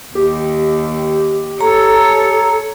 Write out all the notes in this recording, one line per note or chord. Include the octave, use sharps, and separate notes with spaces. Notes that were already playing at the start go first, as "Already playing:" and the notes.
D#2 G4
A4 C#5 A#5